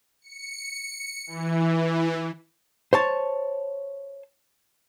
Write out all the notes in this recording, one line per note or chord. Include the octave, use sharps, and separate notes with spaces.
C#7
E3
C5 C#5 A5